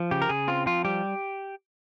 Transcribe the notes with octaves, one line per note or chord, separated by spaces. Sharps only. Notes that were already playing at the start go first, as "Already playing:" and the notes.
Already playing: F3
C#3 G4
A#4
C#3 G#4
C4 F4
F3 F4
G3 G4